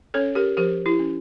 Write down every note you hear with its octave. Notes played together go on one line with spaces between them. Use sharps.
C#4 A4 C#5
G4 A#4
F3 G4 A#4
E4 G4
C#4